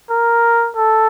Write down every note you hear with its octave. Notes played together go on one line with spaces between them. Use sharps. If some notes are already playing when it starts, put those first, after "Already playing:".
A#4
A4